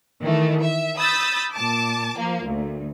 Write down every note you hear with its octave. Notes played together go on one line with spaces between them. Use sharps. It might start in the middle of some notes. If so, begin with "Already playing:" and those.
D#3 E3 A3
E5
B5 D#6 E6 G6 A6 B6
A#2 A5 D6
F3 A#3
D2